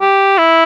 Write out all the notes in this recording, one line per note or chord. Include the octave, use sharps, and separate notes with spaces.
G4
E4